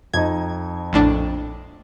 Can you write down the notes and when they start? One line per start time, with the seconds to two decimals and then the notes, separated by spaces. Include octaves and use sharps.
0.13 F2 D#4 G#6
0.93 A#1 A2 D4